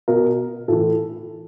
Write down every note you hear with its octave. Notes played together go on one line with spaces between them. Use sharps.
B2 A#4
A2 E3 A4